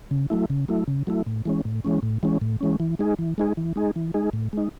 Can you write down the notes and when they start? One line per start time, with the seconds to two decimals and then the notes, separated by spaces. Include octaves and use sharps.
0.11 C#3
0.30 F#3 A3 E4
0.50 C#3
0.68 F#3 A3 E4
0.88 C#3
1.07 F#3 A3 E4
1.26 A2
1.46 E3 G#3 C#4
1.65 A2
1.85 E3 G#3 C#4
2.03 A2
2.23 E3 G#3 C#4
2.41 A2
2.61 E3 G#3 C#4
2.80 E3
2.99 G#3 D#4 G#4
3.19 E3
3.38 G#3 D#4 G#4
3.57 E3
3.76 G#3 D#4 G#4
3.96 E3
4.14 G#3 D#4 G#4
4.33 A2
4.53 G#3 D#4